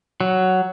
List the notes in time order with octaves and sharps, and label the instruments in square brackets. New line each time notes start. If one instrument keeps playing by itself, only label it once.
[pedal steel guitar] F#3